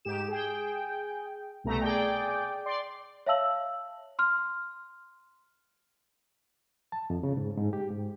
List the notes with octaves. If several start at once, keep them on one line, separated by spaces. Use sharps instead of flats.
G#2 G4 E7
G#4 G5
C2 B2 A3 A#5
G#4 D5 G5
D5 C6
C#5 E5 F5 A5 E6 F#7
C6 F6
A5
F2
C#3
G#2
G#2
G4
G#2